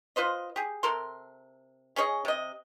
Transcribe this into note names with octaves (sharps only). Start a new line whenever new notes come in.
F4 B4 C5 D#5
G4 G#4
C3 A4 A#4 C6
C#4 G#4 C#5 D#5
C3 D#5